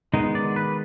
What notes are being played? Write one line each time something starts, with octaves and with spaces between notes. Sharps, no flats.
D#3 G#3 B3 D#4
D5
B4